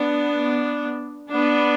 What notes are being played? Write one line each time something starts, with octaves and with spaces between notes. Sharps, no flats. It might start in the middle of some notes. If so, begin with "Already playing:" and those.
Already playing: B3 D4
B3 D4